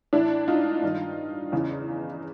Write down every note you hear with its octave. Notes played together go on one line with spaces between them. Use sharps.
A2 E3 D4 E4
D#4 F4
G2 D#3
E2 C#3 E3